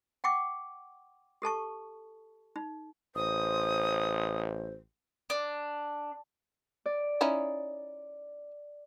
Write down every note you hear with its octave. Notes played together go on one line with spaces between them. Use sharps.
F#5 G5 C#6 D6
G4 A4 A5 C#6
D#4
A1 C5 D#6
D4
D5
C#4 D#4 E4